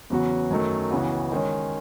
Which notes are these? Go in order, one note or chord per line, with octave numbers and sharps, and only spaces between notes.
E2 C#3 F#3 B3 F#4
F#2 D#3 F#3 A3
C#2 C#3 E3 B3 F#4
D#3 G#3 C#4